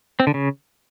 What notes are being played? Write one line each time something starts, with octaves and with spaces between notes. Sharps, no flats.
C4
D3
C#3